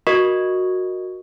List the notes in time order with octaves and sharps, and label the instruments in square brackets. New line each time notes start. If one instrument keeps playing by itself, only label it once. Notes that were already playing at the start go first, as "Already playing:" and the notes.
[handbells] F#4 A#4 D#5 C#6